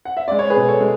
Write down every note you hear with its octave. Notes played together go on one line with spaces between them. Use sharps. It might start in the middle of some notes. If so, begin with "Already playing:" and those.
F#5
E5
G#3 D5
C#5
G#4 B4
B2
A4 C#5
G#3